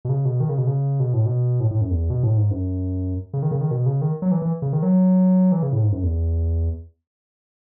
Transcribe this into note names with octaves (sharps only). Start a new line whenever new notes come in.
B2
C#3
B2
D#3
C#3
B2
C#3
B2
A2
B2
A2
A2
F#2
E2
B2
A2
G#2
F#2
C#3
D#3
C#3
D#3
B2
C#3
D#3
F#3
E3
E3
C#3
D#3
F#3
E3
C#3
A2
G#2
F#2
E2